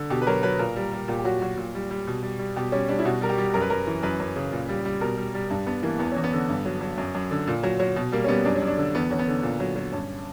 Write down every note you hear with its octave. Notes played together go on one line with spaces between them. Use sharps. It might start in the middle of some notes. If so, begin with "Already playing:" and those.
Already playing: D3
B2 G4
B4
F#3 A#4
F#3 B4
A#2 A#4
G3
G3
A#2 G4
G4
F#3 F#4
F#3 F#4
A#2
G3
G3
B2
G3
G3
B2 G4
G3 C#4
G3 D4
E4
B2 F#4
G3 A#4
G4
G3
F#2 A#4
B4
F#2 A#4
E3
F#2 B4
F#2
C#3
A#2
G3
G3
B2 A#4
G3
G3
G2
G2 B3
E3 A#3
E2 B3
E2 C#4
B3
D3
G2
F#3
F#3
F#2
F#2
D3
A#2
F#3
F#3
B2
G3 A#3
C#4
G3 B3
F#2 D4
C#4
F#2
D4
D3
E2 B3
E2 C#4
B3
D3
A#2
F#3
F#3
G2 C#4